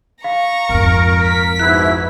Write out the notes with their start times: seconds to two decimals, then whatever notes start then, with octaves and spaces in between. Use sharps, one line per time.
0.24 F5 A#5 C#6
0.69 G#1 F2 A#4
1.24 B6
1.59 G#2 B2 E4 F#6